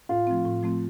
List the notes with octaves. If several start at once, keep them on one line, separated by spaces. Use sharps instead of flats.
A2 F4
F3 A3 C4
A2
F3 A3 C4